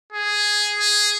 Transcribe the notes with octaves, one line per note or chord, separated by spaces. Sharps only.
G#4
G#4